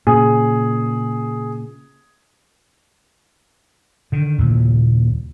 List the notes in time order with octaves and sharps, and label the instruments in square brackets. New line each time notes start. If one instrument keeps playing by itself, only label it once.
[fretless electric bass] A#2 C#3 [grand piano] G#4
[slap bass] D3 D#3
D#2 A#2 C#3